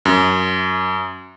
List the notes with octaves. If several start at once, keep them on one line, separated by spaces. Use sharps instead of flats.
F#2